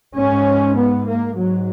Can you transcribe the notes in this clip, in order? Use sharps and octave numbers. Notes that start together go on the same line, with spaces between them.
G#2 C#4
B3
A#3
G#2 F#3